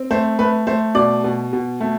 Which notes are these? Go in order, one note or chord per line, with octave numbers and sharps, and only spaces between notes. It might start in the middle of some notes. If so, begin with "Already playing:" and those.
Already playing: C4
A3 C5
A3 B4
A3 C5
B2 D5
B2
B2
A3